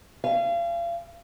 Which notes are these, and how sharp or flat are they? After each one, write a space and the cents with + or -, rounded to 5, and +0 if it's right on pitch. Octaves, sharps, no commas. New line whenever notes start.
F5 -35 G#5 +0